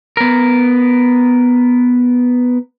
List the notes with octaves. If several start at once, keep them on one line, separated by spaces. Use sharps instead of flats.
B3 A#4